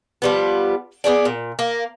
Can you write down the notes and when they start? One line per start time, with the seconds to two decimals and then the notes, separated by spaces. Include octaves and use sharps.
0.22 F3 G3 B3
1.04 B3 D4 G#4 D5
1.25 A#2
1.59 A#3